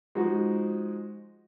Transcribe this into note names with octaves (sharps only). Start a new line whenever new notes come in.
F3 G#3 D#4 F#4